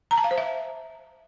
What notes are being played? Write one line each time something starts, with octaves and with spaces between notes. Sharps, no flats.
A#5
A5
F5
C5
E5